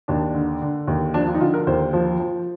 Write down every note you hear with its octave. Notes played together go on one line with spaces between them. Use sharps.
D#2 D4
D3
D3
D#2
F3 D4
F4
D#4
D3 F4
A#4
D#2 C5
F3
F3